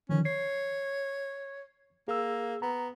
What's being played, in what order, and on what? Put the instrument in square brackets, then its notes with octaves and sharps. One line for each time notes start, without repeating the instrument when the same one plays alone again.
[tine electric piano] D3 D#3 F3 [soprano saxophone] C#4
[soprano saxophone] C#5 [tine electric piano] C7
[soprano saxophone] A#3 [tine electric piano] G#4 E6
[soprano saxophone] B3 [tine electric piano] A#5